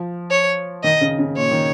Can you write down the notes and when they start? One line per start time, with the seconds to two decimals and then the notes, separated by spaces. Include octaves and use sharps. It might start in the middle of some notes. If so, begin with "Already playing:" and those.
Already playing: F3
0.31 C#5
0.84 D#3 D#5
1.01 C#3
1.19 C#3
1.36 A#2 C#5
1.51 D#3